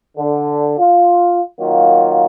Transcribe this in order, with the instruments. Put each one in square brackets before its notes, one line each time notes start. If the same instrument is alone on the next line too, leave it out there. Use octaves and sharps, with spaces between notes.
[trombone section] D3
F4
D#3 F#3 A#3 F4